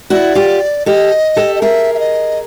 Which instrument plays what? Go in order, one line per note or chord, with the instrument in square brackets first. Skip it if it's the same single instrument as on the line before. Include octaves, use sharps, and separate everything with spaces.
[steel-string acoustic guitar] E4 F#4 [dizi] D5
[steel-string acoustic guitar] F4 G4
[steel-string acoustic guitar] G4 A4 [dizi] D#5
[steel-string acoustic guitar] G4 A4
[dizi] D#5
[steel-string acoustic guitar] G#4 A#4 [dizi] E5
[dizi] E5
D#5